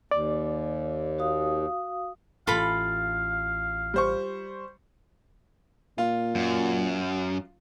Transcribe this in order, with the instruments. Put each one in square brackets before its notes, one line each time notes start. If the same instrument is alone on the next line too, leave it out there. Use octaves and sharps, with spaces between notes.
[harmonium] D#2 [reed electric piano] D5
[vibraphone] F#4 F5 D#6
[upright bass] A1 [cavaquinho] F4 A4 B5 [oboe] F5
[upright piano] G3 C5 C#6
[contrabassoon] A#2 [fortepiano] F4
[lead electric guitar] F#2